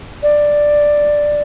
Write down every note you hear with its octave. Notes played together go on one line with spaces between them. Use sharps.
D5